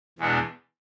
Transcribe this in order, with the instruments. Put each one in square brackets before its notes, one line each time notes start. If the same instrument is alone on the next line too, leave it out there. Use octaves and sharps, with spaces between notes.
[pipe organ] E2 B2 G#3 B3 D4